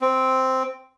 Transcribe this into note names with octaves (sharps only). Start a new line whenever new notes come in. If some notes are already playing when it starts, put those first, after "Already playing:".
C4